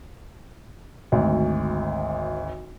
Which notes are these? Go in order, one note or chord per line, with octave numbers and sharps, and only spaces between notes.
G#1 D2